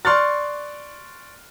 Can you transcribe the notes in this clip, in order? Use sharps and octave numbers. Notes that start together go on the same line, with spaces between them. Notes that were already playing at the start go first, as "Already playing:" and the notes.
D5 C6 C#6 F6 F#6 A6